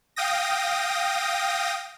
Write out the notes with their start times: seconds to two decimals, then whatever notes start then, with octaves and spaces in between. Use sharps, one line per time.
0.16 F5 G5 D#6 A#6